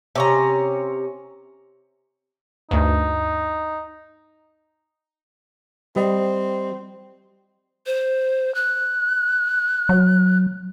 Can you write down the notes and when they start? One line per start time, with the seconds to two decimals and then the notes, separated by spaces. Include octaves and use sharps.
0.15 C3 C#4 A#5
2.71 D2 G2 D#4
5.96 G3 C4 D#5
7.87 C5
8.55 F#6
9.89 F#3